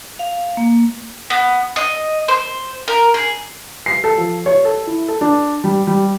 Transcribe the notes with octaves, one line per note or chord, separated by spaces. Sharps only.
F5
A#3
B3
D#5
C5
A#4
G#4
C7
A4
F3
C#5
A4
E4
A4
D4
G3
G3